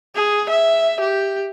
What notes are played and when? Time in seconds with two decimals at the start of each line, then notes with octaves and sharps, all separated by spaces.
0.15 G#4
0.49 E5
1.01 G4